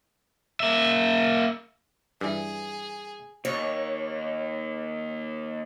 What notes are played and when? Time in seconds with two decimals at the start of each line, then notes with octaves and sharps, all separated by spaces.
0.60 A#3 E5
2.21 G2 E3 G#4
3.45 D#2 C#5